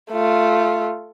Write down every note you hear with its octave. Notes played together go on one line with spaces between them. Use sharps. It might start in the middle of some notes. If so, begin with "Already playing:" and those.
A3 F4